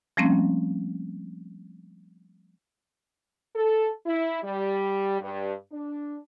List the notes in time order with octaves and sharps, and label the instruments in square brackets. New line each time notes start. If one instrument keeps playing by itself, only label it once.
[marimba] F3 G3 A3 A#3 C4 C#4
[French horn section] A4
E4
G3
G2
D4